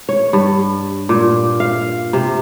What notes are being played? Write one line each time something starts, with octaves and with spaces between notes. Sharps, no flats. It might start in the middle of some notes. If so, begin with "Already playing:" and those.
C#5
G2
A#2
F5
C3